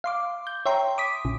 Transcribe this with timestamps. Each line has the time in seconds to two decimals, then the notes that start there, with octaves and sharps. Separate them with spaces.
0.04 F5 C6 D6
0.47 G6
0.66 C#5 E5 G5 A#5 C6
0.98 D6 D#6 B6
1.25 A#1 C#3